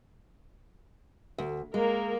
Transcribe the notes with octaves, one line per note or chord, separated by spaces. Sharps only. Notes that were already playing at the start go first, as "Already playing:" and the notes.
D2
G#3 A#3 A#4